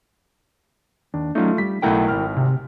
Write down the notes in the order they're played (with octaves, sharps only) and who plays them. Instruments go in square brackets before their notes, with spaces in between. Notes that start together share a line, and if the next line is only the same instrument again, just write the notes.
[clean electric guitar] D#2 [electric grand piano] D4
[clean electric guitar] F#3 C#4 D#4 [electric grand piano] A3 F4
[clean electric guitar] G3 [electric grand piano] B6
[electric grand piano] B1 A3 F#5 [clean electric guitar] E4 A#4 G5
[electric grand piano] G#1 F6
[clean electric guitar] C3